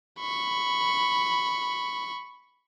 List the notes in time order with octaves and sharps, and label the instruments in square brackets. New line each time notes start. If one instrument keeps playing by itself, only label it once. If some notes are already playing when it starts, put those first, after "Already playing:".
[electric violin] B5 C#6